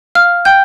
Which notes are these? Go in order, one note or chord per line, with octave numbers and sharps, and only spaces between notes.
F5 F6
G5 G6